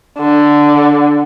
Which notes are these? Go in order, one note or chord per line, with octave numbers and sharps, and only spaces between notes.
D3